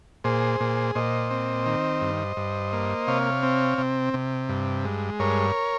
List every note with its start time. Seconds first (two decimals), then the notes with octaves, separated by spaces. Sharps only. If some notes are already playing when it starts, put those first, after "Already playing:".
0.24 A#2 G#4 C5
0.60 A#2
0.95 A#2 C5 D#5
1.31 C4
1.66 D#3
2.01 G2
2.37 G2
2.73 A#3
3.07 C3 C#5 F5
3.43 C4
3.78 C3
4.14 C3
4.49 G2
4.85 G#3
5.19 G2 A#4 C#5